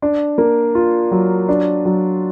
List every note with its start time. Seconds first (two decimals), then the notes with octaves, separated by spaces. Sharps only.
0.02 D4
0.38 A#3
0.75 F4
1.11 F#3
1.49 D4
1.85 F#3